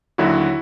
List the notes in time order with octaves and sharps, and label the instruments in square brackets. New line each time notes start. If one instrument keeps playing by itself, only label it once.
[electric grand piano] D#2 D3 F#3 E4 F#4